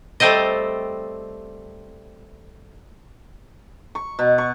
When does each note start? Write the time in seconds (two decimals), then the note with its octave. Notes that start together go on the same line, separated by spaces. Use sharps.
0.20 G3 A3 C4 C5 D#5
3.95 C#6
4.19 B2
4.38 C#6